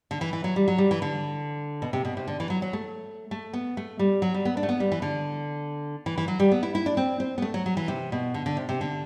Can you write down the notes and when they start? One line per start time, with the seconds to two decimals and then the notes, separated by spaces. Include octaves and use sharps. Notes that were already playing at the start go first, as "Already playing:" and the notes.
0.11 D3
0.21 E3
0.33 E3
0.44 F#3
0.56 G3
0.68 F#3
0.78 G3
0.91 E3
1.02 D3
1.82 B2
1.93 C3
2.05 B2
2.17 C3
2.27 D3
2.40 E3
2.50 F#3
2.62 F#3
2.73 A3
3.31 A3
3.53 B3
3.77 A3
3.99 G3
4.22 F#3
4.34 G3
4.45 B3
4.57 D4
4.63 A3
4.69 B3
4.80 G3
4.92 E3
5.02 D3
6.06 E3
6.18 E3
6.28 F#3
6.40 G3
6.52 B3
6.63 E4
6.75 E4
6.86 D4
6.97 C4
7.20 C4
7.38 B3
7.42 A3
7.54 F#3
7.66 F#3
7.77 E3
7.88 C3
8.12 B2
8.34 D3
8.46 D3
8.57 C3
8.69 C3
8.81 D3